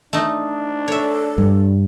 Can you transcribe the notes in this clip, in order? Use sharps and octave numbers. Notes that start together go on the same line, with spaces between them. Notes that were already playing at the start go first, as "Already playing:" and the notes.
A3 D4 D#4
A4 C#5 E5
G2